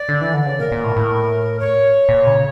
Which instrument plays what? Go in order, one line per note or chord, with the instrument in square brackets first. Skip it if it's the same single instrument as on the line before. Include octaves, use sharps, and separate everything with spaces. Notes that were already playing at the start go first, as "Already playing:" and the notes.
Already playing: [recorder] D5
[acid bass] D3
E3
D3
C#3
[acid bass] A#2 [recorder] A#4
[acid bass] A#2
A2
A2
[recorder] C#5
[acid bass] A#2
C#3